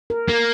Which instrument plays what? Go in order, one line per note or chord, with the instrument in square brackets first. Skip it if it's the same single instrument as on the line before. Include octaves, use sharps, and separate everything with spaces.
[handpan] A#4
[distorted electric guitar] A#3 [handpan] A#4